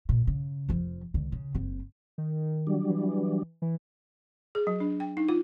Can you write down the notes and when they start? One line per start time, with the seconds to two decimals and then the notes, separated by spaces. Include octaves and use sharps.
0.09 A#2
0.27 C#3
0.69 F1 F3
1.14 C#2 D3
1.32 C#3
1.55 F#1 C4
2.18 D#3
2.67 F#3 G3 D4
2.89 E3
3.62 E3
4.55 G#4
4.67 F#3
4.80 D4
5.00 G5
5.17 D#4
5.29 F4